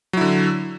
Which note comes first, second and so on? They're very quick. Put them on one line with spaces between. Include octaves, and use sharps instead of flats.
F#3 E4 D3